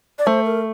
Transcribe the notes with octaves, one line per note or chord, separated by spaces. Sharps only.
D5
A3 C5
A#4